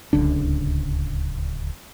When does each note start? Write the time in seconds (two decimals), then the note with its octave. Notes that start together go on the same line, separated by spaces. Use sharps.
0.13 D1 C#2 D3 D4